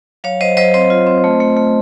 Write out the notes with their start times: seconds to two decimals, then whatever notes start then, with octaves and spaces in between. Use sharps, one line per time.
0.24 F#3 C#5 F5
0.41 F#3 C5 D#5
0.57 F#3 C5 D#5
0.74 C4 C5 D#5
0.90 F4
1.07 C4
1.24 A3
1.40 A3
1.57 A3